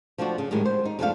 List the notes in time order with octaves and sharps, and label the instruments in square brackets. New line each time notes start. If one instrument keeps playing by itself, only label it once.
[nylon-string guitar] F3 A3 C4 D4 F#4
C#3
A2 D#3 G3 G#3
C5
D#4
F2 F#3 G#3 A3 D4 F5